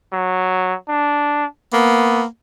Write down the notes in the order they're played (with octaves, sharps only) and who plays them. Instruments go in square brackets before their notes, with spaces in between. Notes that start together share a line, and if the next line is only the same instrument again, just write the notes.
[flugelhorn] F#3
D4
[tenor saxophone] A#3 [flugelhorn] B3